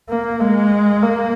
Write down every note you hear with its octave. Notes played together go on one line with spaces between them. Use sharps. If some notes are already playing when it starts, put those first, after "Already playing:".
A#3
G#3
A#3